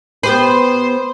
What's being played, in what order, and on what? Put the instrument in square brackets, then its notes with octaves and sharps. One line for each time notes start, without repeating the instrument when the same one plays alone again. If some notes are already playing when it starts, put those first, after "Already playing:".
[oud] B3 G4 B4 [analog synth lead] C5